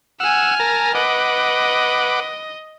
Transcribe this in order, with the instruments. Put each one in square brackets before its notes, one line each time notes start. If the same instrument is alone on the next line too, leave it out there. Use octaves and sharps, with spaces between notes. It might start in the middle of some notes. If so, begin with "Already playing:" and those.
[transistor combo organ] F#5 E6 [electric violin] G#5 F6
[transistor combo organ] A#4 A5 A#5
[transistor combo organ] B4 F#5 D6 [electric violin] D#5